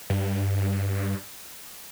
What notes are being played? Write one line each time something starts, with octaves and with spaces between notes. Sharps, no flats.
G2